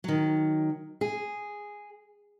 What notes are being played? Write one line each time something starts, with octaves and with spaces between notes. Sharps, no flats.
D#3 F#3
G#4